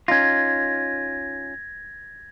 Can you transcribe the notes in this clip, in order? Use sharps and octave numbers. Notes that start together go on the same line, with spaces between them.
C#4 D#4 F4 G#6 A#6